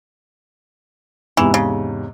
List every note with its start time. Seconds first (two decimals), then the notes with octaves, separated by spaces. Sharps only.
1.37 E2 G#2 C3 E3
1.54 C#3